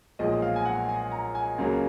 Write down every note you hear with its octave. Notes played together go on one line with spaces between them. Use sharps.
B1 A#2 F3 G#3 D#5
F5
G#5
F#5
G#5
A#5
G#5
C#2 C#3 F#3 A#3